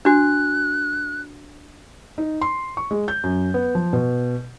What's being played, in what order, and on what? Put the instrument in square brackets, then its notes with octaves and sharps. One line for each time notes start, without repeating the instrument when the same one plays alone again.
[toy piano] D4 F#4 [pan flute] F#6
[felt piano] D#4
C6
C#6
G#3
G6
F#2
B3
F3
B2